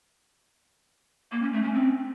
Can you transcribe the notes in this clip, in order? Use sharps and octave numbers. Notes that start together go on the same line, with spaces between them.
A#3
C#4
A3
C#4
C4